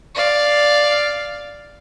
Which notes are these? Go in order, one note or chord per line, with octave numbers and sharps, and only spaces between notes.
D5 F5